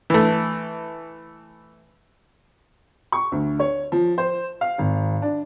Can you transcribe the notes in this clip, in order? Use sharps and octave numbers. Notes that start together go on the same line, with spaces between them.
E3 A3
C#6
D2
C#5
F3
C5
F5
G#1
D4